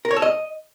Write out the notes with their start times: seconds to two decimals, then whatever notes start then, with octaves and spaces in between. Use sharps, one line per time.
0.05 A#4
0.11 C#5
0.16 A4
0.22 D#5